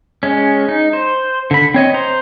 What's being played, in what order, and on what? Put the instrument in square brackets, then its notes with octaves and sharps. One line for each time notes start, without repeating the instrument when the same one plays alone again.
[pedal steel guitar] G#3 C#4
D#4
C5
D3 B5
C4 C#5 D#5
C5 A#5 C6